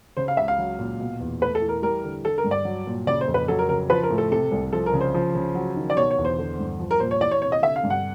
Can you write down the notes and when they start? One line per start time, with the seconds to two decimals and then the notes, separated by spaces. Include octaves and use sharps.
0.17 C#3 C5
0.28 F5
0.37 C#2 E5
0.48 F5
0.59 F#3
0.79 A#2
1.00 B2
1.20 E2
1.41 A3 B4
1.55 A4
1.62 E3
1.69 A#4
1.82 G3 A#4
2.04 D3
2.25 D3 A4
2.38 A#4
2.44 G2
2.51 D5
2.65 F#3
2.87 A#2
3.07 C#3 D5
3.21 C5
3.28 F2
3.34 B4
3.48 F#3 A4
3.59 A#4
3.69 C#3 A#4
3.90 F3 B4
4.03 A#4
4.10 A2
4.18 A4
4.31 C3 A4
4.52 C2
4.73 F3 A4
4.86 A#4
4.93 C#3
5.01 C5
5.14 F3
5.35 C#3
5.55 F#3
5.77 D#3
5.90 D5
5.97 B2 C#5
6.11 C#5
6.18 E2
6.25 C5
6.38 D3
6.59 G2
6.80 F3
6.91 A#4
7.00 A#2 C5
7.11 C#5
7.21 E3 D5
7.31 C#5
7.42 C3 C#5
7.52 D#5
7.62 D3 E5
7.76 F5
7.83 G2
7.90 F#5